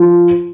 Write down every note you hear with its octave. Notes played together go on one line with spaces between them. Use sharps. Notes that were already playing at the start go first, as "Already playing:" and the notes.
Already playing: F3